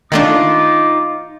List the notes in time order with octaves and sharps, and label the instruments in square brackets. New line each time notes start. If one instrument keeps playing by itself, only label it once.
[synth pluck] D#3 A3 D4 [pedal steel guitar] D#4 F4 [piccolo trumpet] D6